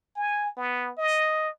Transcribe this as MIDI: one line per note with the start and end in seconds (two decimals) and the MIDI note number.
0.16 0.50 80
0.57 0.91 59
0.98 1.49 75